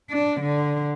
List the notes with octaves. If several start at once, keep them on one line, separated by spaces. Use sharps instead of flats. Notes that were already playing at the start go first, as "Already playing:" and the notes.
D4
D3